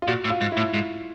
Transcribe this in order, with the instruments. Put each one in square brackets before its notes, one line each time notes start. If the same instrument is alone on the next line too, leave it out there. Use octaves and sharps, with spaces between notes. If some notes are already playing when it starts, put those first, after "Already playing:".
[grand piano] F4
[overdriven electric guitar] A#2 [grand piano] F#4
[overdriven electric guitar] A2
[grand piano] F4
[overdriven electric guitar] G#2
[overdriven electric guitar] A2 [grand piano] E4
[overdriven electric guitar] G#2